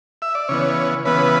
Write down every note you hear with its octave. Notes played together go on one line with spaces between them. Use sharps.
E5
D5
C#3 E3 B3 C#5
C#3 E3 B3 B4